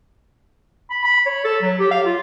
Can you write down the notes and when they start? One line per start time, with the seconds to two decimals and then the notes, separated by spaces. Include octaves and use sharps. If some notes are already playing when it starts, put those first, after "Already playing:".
0.90 B5
1.04 B5
1.26 C#5
1.44 A4
1.62 F#3
1.79 G4
1.91 F5
2.05 F4